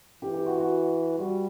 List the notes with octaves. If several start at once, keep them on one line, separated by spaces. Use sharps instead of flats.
E3 G4
G4
F#4
F#4
G3 F#4